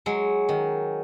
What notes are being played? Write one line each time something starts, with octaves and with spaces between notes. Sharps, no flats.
F#3 G#3
D#3